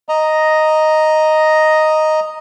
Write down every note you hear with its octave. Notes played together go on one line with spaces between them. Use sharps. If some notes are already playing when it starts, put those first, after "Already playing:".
D#5 A#5